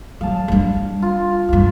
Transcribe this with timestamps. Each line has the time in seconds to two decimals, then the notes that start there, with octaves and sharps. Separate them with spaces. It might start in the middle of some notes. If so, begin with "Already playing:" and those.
0.21 F#3 F5 A5
0.48 G3 D4
1.02 F4
1.49 C#2 G2 F5